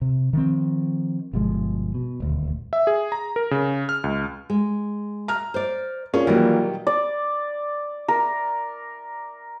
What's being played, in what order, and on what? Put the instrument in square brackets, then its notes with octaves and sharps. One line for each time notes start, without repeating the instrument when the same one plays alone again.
[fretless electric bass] C3
D#3 F3 C4
G1 B2 F3 G#3
B2
D#1 D2
[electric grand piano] E5
G#4
A#5
A#4
C#3
F6
C#2
[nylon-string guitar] G#3
[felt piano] A#5 F6
[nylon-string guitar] C5 D5
[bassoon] A#2 [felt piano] C#4 [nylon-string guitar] G#4
[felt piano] D#3 F#3 G3 [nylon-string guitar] E3 A#3
[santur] D5
A#4